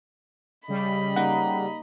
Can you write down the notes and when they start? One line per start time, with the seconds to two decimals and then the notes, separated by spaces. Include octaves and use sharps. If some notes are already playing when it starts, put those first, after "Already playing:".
0.68 C#3 G3 D#5 B5
1.16 A#3 D#4 F#5